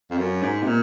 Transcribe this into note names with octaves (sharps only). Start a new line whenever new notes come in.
F2
F#2
G#2
C3
A#2